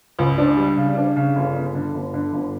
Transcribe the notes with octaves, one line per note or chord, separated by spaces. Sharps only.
C#2
D4
G3
C#3
D4
C#3
G1
G1
D3
G1
D3
G1